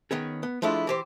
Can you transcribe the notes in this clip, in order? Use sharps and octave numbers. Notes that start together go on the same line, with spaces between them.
D#3 B3 C#4 G#4
B3
F3 G#3 A3 D4 E4 F4
E3 G4 C5